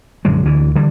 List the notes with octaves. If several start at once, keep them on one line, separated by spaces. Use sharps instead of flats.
A#1 F#2 D3 G#3
D2 D3 E3
D3 E3 G3